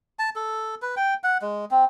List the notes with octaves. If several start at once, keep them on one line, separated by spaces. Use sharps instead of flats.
A5
A4
B4
G5
F#5
G#3
C4